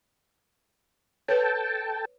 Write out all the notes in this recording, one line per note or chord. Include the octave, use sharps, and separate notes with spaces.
A4 B4 C#5 G5 A5